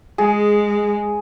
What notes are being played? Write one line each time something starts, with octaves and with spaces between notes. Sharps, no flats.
G#3 G#4